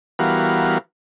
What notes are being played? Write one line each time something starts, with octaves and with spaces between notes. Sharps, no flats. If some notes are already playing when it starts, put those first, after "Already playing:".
E3 G3 B3 F#4 A#4 F5